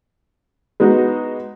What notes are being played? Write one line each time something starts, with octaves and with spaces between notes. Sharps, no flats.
G#3 B3 D#4 F#4